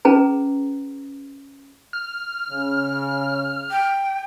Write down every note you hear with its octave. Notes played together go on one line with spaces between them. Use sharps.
C#4 G#4 B4 A#5
F6
C#3
G5